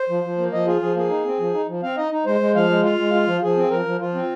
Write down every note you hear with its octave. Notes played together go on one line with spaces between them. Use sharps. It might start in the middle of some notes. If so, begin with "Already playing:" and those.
Already playing: C5
F3
F3
A#3
F3 D#5
F4 G#4
F3 G#4
A#3 G#4
D#4
C4
F3
D#4
F3
C4 F5
D#4 D#5
D#4
G#3 C5
G#3
F3 F5
G#3
F4 F5
G#3
F4
F3
F3 G#4
C4
F3 A#4
F3
F3 F4
C4